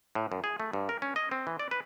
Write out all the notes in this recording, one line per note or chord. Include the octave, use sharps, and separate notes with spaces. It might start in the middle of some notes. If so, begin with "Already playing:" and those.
A2
F#2
G#4
A3
G2
A#4
C#4
D#5
C4
E3
D5
B4